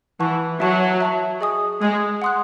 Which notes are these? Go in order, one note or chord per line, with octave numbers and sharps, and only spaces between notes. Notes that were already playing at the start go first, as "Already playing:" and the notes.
E3 F#5 A5 C#6 F#6
F#3 E5 A5 C#6
E5 A5 C#6
G#4 D#5 G#5 D#6
G#3 G#4 D#5 G#5 D#6
F#5 C6 D#6 F#6